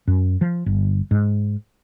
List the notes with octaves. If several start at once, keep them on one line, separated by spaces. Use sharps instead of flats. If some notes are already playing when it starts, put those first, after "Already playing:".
F#2
F3
G1
G#2